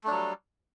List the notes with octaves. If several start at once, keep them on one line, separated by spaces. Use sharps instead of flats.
F#3 G3 A3 D4